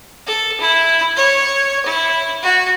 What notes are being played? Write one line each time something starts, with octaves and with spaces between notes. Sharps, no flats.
A4
E4
C#5
E4
F#4